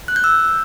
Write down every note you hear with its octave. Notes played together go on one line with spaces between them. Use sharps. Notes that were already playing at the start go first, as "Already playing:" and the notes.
F#6
G6
E6